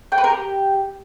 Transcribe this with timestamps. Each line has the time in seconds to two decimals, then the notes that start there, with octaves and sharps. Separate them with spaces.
0.12 G5
0.18 B4
0.24 A#4
0.30 G4